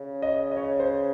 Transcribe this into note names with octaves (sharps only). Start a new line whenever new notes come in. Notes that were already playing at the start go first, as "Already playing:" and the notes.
Already playing: C#3
D#5
D#5
C#5
C5